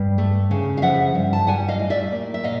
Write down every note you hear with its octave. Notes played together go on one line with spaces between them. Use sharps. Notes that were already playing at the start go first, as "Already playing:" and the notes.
Already playing: G2
A3
C#3
F5
F3 E5 F#5
G2
A5
G3 F#5 G#5
D#5 F5
A2
D5 E5
A#3
E5
A#2 D#5 F5